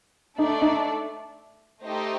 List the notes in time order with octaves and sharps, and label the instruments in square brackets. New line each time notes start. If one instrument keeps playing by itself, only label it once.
[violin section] A3 D4 A4 D5 [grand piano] D#4
[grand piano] D#4
[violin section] A3 D#4 G4 C5